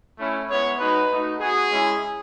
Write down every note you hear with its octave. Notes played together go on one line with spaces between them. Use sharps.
A3 C#4 E4
G#3 B3 E4 C#5
G#3 D#4 F#4 B4
A3 D#4 F#4
B3 F#4 G#4
G#3 C#4 E4